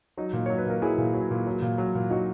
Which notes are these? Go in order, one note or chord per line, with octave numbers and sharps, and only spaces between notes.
F#3 D#4
A#2
F#3 C#5
B4
A#2 A#4
F#3 E4 G#4
A#2
F#3
A#2
F#3
A#2
F#3
A#2
F#3 D#4 F#4